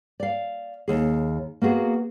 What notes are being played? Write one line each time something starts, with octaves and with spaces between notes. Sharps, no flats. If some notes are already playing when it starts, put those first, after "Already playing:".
D5 F5
D#2 G#4
A#3 B3 F#4 G#4